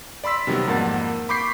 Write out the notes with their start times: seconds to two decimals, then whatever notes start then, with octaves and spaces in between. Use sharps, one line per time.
0.24 D5 B5 C6 E6 B6
0.47 C3 D#3 F#3 G3 B3
0.67 F2 G#2 A#3 A#4 F#5 A6
1.29 B5 C#6 D6 G6 B6 C7